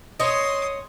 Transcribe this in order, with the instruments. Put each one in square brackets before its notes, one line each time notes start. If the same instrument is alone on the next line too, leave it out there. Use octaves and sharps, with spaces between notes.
[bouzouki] C#5 D#5 [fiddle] C6 D#6